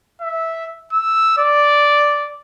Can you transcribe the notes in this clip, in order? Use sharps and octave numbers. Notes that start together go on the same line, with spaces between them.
E5
E6
D5